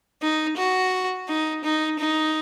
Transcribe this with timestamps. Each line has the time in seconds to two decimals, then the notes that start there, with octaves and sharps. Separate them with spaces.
0.22 D#4
0.57 F#4
1.28 D#4
1.64 D#4
1.99 D#4